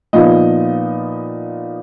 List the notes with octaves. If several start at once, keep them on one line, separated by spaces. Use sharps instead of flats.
A#2 F3 B3 D#4 D#5